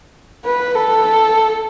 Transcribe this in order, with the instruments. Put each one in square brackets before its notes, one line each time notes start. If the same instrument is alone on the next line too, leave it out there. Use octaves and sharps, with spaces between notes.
[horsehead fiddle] B4
A4